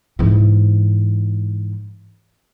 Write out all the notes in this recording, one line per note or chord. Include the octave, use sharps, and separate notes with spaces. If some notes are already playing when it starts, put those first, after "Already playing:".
G#2 E3